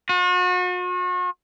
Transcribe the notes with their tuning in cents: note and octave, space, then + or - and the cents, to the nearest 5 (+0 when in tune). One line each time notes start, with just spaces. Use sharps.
F#4 -40